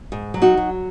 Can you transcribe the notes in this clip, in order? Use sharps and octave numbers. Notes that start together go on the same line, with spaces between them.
G#2
F#3
D#4 F#4
F#3